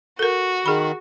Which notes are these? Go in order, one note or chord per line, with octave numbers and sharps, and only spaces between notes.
F#4 A4 A#4
D#3 G#4 B5